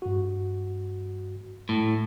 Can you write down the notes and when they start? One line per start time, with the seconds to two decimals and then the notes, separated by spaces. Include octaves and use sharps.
0.02 G2 F#4
1.69 A2